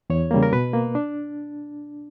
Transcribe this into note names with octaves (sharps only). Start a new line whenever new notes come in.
E2 C#5
C#3 G3 A#3
A#4
B2 B4
A#3
D4